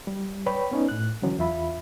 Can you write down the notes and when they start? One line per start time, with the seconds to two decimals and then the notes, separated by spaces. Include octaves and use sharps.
0.07 G3
0.46 B4 C#5 D5 G5 B5
0.71 B3 C#4 D#4
0.88 A2 F#6
1.22 D3 E3 F#3 C#4
1.38 E2 F4 E5 B5